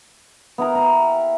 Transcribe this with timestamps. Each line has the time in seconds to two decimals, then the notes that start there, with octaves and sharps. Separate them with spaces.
0.58 B3 E4 A#4
0.75 G4 A#4